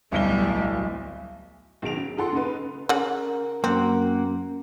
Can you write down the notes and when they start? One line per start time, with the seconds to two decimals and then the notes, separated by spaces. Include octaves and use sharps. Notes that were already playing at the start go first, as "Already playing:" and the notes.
0.12 D1 B1 G3 A3 B3 G7
1.82 B1 D#3 G#4 D7 F7
1.96 C#4
2.17 D#4 F4 G#4 A4 F#5 C6
2.33 C#3 D#4 B4
2.89 C#3 A#4 F#5
3.64 F#2 A#3 C4 F#5